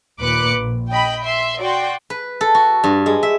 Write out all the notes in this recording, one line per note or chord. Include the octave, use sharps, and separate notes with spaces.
D#2 A#2 B4 D6 F#6 C#7
A#1
D#5 G5 B5
E5 C6
F#4 D5 G5 C6
B4
A4
F#4
G2
G#3
E5